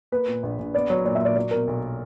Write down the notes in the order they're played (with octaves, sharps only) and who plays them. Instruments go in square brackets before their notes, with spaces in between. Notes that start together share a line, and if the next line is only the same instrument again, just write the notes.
[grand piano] A#3 [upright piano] B4
[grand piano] A#2
A#1
A#1
[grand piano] B3 [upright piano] D5
[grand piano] F#3 [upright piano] C#5
[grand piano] A#2 [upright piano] D5
[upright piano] E5
[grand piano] A#2 [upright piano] D5
[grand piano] F#3 [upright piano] D5
[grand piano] B2 [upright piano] A#4
[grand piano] B1